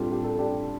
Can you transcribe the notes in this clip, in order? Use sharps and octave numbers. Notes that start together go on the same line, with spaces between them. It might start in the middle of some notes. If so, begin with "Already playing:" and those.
Already playing: A2 G3 C4 D4 F4 G4 A4
G4
A4
D4 G4